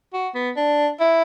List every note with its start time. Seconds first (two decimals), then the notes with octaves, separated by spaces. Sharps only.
0.14 F#4
0.35 B3
0.57 D4
1.00 E4